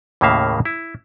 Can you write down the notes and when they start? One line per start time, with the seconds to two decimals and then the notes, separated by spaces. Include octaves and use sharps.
0.21 D#2 A2 C#3 A#3 E5 F5
0.65 E4